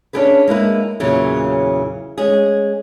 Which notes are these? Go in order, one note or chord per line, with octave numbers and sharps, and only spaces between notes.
C#4 D4 E4 G4 G#4 B4
G#3 A#3 E4 B4
E2 A#2 C#3 E3 F#3
G#3 C#4 G#4